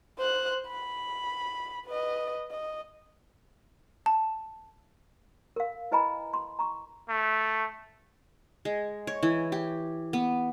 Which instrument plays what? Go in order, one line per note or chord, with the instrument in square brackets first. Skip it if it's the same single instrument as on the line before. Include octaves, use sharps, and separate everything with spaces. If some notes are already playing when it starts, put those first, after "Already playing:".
[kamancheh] C5 F#6
B5
B4 D#5
D#5
[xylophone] A5
[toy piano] A#4 F5
E4 B4 D#5 G#5 A#5 B5
C6
A#5 C#6
[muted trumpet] A3
[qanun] G#3
C#5
E3
G4
B3